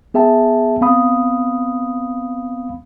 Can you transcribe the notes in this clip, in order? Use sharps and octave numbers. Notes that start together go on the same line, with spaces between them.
B3 G#4 E5 G5 A5
B3 C4 F5 B5 D#6